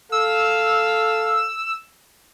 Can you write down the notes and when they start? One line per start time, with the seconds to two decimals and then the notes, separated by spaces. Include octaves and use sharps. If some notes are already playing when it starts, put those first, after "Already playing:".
0.12 A4 F5 E6